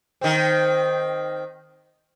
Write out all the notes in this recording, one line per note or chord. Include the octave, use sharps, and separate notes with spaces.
D#3 C4